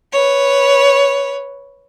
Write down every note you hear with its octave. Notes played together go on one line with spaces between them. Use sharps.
B4 C#5